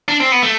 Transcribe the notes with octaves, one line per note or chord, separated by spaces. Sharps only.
D4
C4
B3
A3